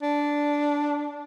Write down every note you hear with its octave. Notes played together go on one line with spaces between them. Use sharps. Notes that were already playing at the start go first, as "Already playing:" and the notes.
D4